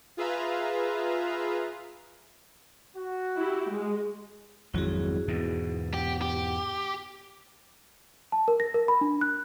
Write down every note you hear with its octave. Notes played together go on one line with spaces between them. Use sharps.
F4 G#4 B4 E5 F5 A#5
F#4
E4 G4
G#3
G#1 F2 F#3 E4 F#4 G#4
E2 G#2 B2
G4 F#5
G4
A5
A#4
A#6
A#4
B5
D4
F#6